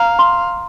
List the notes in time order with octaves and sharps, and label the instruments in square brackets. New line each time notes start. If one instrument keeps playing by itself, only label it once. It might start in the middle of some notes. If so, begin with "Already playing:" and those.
Already playing: [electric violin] F5 [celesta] A#5
[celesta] C6